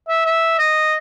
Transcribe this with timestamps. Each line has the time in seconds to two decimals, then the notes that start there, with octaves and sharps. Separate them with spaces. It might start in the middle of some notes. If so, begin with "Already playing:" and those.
0.08 E5
0.25 E5
0.58 D#5